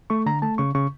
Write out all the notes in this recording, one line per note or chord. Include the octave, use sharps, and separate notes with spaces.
A3 C#6
D3 A#5
A3 A5
C#3 C#6
C#3 C#6